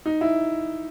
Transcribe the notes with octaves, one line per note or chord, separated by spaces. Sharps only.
D#4
E4